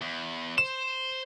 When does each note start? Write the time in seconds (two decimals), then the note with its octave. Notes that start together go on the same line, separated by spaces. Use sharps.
0.01 E2
0.58 C5 E7